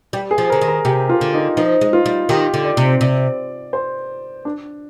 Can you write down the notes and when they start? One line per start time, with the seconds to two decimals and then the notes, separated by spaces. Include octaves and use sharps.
0.13 G3 G4
0.31 G#4
0.38 F3
0.50 D3 A#4
0.61 D#3
0.68 A#4
0.85 C3 G4
1.09 F4
1.21 D3
1.34 D#4
1.57 F3 D#4
1.81 G#3
1.93 F4
2.06 G3
2.29 D#3 G4
2.54 D3
2.65 D5
2.77 C3
3.01 C3 D5
3.73 C5
4.45 D4